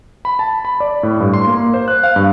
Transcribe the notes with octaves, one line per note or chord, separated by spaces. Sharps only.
B5
A5
B5
D5
A2
G2
C6
A#3
C5
F#6
F5
G2